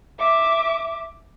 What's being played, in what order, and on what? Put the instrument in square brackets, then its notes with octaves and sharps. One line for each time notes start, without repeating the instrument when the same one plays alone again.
[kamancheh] E5 D6